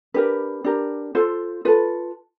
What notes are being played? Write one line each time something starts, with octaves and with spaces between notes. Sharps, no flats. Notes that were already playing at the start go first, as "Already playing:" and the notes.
D4 G4 A#4 B4
D4 G4 A#4
F4 A4 C5
F4 A4 B4